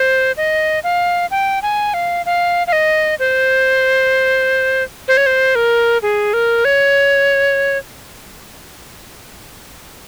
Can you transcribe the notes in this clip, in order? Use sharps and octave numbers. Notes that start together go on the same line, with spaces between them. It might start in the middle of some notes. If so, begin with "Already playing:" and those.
Already playing: C5
D#5
F5
G5
G#5
F5
F5
F5
D#5
C5
C5
C#5
C5
A#4
G#4
A#4
C#5